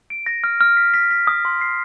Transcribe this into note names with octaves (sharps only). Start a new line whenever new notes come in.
D7
A#6
F6
F6
B6
B6
B6
D#6
C6
C7